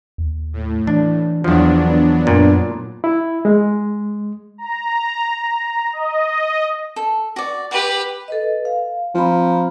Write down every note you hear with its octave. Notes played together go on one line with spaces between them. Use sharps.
D#2
A2
E3 D4
E2 F3 F#3 B3 D4
F#2 A#2
E4
G#3
A#5
D#5
A4
F#4 D5
G4 B4 F#5
A4 B4 D#5
F5
F3 C4 A#5 B5